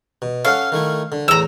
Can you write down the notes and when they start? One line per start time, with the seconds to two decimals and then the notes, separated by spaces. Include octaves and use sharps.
0.22 B2
0.45 C#4 A4 F5 F#5
0.72 D#3 A3 E4
1.12 D3
1.28 E2 A2 A#5 E6